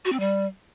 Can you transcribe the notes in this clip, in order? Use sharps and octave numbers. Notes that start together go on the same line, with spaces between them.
F#4
C4
G3